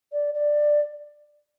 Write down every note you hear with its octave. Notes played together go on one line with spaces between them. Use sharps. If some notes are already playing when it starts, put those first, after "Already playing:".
D5
D5